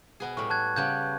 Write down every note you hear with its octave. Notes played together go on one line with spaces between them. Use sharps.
B2 B3 G#4
A2 G3 C#6
A5 F#6 G#6
C#3 G3 B3 G6